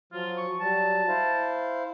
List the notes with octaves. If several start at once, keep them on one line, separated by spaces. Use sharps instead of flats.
F3 F#3 F4
C#6
F#3 G3 A5
E4 C5 F5